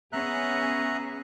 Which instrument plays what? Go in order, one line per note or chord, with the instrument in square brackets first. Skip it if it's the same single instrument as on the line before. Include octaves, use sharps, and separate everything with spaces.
[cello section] B3 C#4 G#4 [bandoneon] E5 A#5 F#6